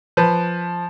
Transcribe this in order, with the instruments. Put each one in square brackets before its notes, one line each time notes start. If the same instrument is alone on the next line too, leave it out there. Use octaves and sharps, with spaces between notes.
[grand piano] F3 B4